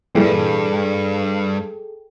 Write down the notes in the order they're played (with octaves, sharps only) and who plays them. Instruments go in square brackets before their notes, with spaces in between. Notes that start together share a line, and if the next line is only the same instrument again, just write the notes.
[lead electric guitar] E2 G2 [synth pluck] A#2 E3 G3 [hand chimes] G#4 A4 G5